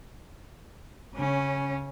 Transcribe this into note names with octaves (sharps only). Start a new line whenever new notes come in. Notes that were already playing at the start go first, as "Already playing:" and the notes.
C#3 C#4